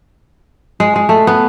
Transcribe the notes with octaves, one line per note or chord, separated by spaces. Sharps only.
G#3
G#3
A3
B3